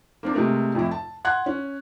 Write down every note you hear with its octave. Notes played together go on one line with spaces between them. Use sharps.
A#3 C4 D4
C3 G#3 A3 A#4
F2 A2 E4
A5
F#5 C6 F#6 G#6
C#4